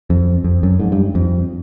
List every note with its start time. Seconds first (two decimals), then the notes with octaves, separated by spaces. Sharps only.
0.10 F2
0.44 F2
0.63 F#2
0.79 G#2
0.92 G2
1.15 F2